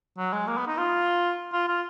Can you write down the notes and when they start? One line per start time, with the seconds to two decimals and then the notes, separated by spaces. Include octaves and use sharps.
0.18 F#3
0.33 G#3
0.47 A#3
0.58 B3
0.67 D#4
0.78 F4
1.53 F4
1.68 F4